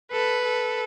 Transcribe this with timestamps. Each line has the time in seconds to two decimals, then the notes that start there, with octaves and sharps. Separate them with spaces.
0.11 A4 B4
0.44 A4